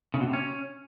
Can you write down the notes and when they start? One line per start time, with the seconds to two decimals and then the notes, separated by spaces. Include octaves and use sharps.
0.14 C#3
0.20 B2
0.27 C3
0.33 C#4